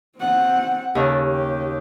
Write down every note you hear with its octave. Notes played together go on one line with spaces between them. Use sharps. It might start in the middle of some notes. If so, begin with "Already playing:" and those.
C4 F#5
D#2 C#3 A4
G4